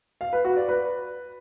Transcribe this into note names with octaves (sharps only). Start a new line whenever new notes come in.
F5
B4
F#4
D5
B4